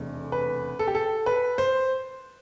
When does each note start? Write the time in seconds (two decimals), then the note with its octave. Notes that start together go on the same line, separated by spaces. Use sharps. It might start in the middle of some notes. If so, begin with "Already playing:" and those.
Already playing: F1 E2 B2 A3 D4
0.32 B4
0.79 A4
0.88 G4
0.95 A4
1.26 B4
1.58 C5